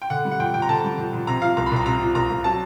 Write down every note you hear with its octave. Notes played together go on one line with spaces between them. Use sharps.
G5
D3 F#5
G3
F#5
F2 G5
F2 G5
A#5
D3 A5
G3
F2
F2
C3 A#5
F3 F5
C2 A#5
B5
C2 A#5
C3 A#5
F3
C2 A#5
C2
F#3 A5